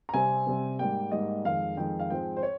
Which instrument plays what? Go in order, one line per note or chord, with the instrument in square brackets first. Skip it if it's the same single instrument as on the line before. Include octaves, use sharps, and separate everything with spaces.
[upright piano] A#5
C3 G3 C4 G#5
C3 G3 C4
G#2 G3 A#3 G5
G#2 G3 A#3 D#5
F2 D#3 G#3 F5
F2 D#3 G#3 G5
F5
G#2 F3 G#3 C4 G5
C5
C#5